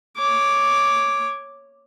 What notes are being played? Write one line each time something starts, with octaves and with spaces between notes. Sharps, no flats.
C#5 D6